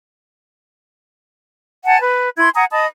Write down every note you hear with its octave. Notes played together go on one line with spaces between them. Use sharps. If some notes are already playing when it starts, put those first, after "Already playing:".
F#5 G#5 A5
B4
E4 C6 G#6
F#5 G#5 A#5 D#6
D#5 A5 B5 D#6